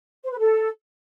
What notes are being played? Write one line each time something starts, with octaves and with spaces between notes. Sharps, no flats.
C5
B4
A4